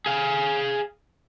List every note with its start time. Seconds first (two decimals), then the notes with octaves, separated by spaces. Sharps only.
0.06 G#4 F5